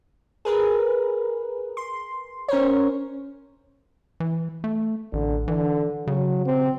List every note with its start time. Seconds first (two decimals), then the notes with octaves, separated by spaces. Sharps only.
0.45 G#4 A#4 B4
1.77 C6
2.48 C#4 A#4 C5 C#5
4.20 E3
4.64 A3
5.13 A1 D3
5.48 D3 E3
6.07 C#3 F#3
6.46 C4